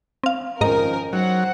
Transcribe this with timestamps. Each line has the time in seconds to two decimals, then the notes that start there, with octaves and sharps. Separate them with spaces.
0.23 C4 F5
0.61 G#2 D#3 F3 C#4 A#4 D#5 A#5
1.13 F#3 D#4 C5 F#5